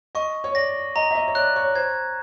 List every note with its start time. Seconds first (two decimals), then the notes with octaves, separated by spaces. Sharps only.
0.15 D#5 C#6
0.44 C#5
0.55 D5 A#6
0.96 D#5 A#5
1.11 E5
1.15 D#5
1.28 C#5
1.35 D5 F#6
1.56 C#5
1.75 C5 G#6